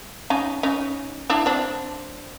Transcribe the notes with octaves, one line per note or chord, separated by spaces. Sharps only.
C#4 D#4
C#4 D#4
D4 E4
C4 D4